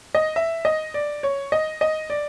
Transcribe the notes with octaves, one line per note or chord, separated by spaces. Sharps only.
D#5
E5
D#5
D5
C#5
D#5
D#5
D5